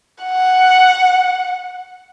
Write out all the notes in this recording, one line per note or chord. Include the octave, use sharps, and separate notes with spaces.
F#5